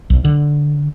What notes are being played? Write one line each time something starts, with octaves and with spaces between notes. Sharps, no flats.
B1
D3